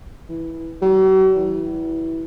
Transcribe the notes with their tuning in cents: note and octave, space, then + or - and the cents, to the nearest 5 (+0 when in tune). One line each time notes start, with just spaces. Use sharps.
E3 -10
F#3 +45
E3 -15